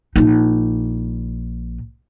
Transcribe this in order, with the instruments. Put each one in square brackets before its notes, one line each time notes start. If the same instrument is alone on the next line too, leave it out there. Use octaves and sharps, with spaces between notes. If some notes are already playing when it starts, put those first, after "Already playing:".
[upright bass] A#1 D#4